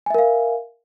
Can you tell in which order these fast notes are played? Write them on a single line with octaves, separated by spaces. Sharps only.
G#5 E5 A#4 F5